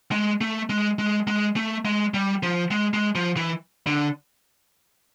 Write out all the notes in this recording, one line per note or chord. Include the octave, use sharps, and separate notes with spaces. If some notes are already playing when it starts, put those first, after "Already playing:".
G#3
A3
G#3
G#3
G#3
A3
G#3
G3
F3
G#3
G#3
F3
E3
D3